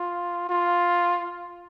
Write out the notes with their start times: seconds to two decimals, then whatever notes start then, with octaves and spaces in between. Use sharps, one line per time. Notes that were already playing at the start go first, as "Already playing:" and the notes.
Already playing: F4
0.49 F4